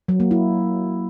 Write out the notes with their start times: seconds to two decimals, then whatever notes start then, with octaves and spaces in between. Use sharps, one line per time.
0.08 F#3
0.20 A#3
0.31 E4